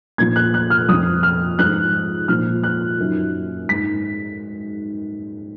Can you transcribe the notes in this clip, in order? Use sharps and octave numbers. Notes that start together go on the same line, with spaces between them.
A#2 F3 G#6
F#6
F#6
F6
F2 F3 D#6
F6
G#2 F3 F#6
A#2 F3 F6
F#6
F#2 D#3
G#2 D#3 B6